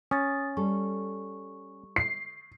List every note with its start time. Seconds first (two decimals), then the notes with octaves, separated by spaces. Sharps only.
0.11 C#4 D#6 A6
0.57 G3 A4 C#6
1.96 C7